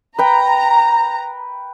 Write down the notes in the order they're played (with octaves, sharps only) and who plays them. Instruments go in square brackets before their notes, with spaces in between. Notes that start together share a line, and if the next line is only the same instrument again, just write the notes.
[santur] B4 G5 [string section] A#5